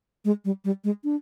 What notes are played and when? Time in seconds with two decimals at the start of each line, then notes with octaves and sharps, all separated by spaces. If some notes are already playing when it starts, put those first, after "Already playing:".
0.25 G#3
0.45 G3
0.65 G3
0.84 G#3
1.04 D4